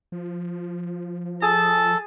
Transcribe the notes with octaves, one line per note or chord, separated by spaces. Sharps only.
F3
G#4 A4 A5